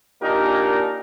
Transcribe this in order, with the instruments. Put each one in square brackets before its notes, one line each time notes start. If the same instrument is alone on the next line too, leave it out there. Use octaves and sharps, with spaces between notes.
[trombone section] A#2 D4 D#4 G4 A#4